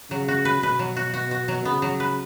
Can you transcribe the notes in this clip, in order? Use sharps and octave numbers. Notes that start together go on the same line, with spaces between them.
C#3 F#3
F#4
B4
B2 B4
F#3
F#4
F#4
F#4
F#3
C#3 B3
F#3
B4